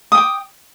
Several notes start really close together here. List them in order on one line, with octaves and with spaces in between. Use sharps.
D#6 G5 D6